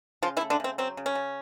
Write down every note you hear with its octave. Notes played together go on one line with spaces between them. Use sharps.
C#3 F3 F4
E3 E4
A3
D3 D4
C#3 C4
F#3 C4
C#3
C#4
C#3